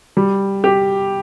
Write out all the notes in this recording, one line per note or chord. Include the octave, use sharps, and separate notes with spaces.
G3
G4